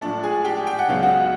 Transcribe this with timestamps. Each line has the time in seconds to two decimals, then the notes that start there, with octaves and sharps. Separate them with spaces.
0.01 A2 F3 A3 D4 D5
0.23 G#4 G#5
0.44 G4 G5
0.67 G5
0.79 F#5
0.88 C#2 C#3 F#3 B3 D#4 F5
1.03 F#4 F#5